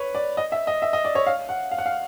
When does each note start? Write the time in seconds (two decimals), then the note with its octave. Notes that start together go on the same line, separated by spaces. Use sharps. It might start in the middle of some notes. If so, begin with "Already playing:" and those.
Already playing: B4 C#5
0.15 D5
0.37 D#5
0.52 E5
0.67 D#5
0.82 E5
0.93 D#5
1.05 D5
1.15 C#5
1.27 F5
1.49 F#5
1.71 F5
1.78 F#5
1.86 F5